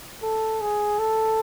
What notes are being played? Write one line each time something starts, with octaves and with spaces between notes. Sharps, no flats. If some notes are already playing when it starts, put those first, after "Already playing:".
A4
G#4
A4